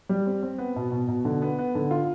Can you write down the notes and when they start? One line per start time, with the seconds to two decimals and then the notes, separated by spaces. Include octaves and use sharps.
0.09 G3
0.27 C4
0.43 C4
0.58 B3
0.76 B2
0.92 B2
1.08 B2
1.25 D3
1.42 B3
1.59 B3
1.75 D3
1.91 F4